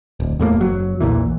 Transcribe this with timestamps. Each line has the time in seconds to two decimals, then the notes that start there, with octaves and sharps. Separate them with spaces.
0.20 D1
0.39 E2 A2 G3 A#3
0.57 F#1 F#3
1.00 A#1 E2 A#2 E3